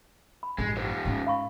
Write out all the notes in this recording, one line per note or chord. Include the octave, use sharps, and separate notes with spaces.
B5
A1 G2 G#3
D#3 G3 C5
G#2 C#4
F5 B5 C#6